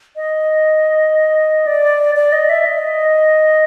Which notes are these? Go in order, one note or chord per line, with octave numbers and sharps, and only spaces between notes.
D#5
D5
D5
D#5
E5
D#5